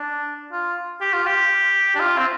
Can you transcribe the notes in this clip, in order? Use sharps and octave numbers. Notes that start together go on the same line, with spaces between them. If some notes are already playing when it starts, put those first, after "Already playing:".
Already playing: D4
F4
G4
F4
G4
D4
F4
C4